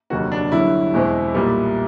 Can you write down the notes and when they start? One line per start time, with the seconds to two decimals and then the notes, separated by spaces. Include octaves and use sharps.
0.10 F1 D#2 D3 F#3 A#3 F#4
0.32 D4
0.52 G1 G2 D3 F#3 E4
0.93 E2 B2 G#3 C4
1.34 B1 A#2 G3 B3